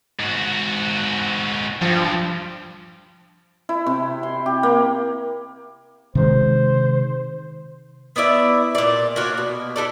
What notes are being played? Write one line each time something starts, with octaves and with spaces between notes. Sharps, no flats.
G#2 F#4
G2 F3
E4
C3
C6
G4
A#3
C3 D#3 G#3 C5
B3 E4 D5 E5
A#2 D5
A#3 F4 F#4 C#5
B2
E4 F#4 A4 D5